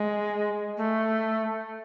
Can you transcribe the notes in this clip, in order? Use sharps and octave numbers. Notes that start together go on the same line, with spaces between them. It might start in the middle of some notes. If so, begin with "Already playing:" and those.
Already playing: G#3
A3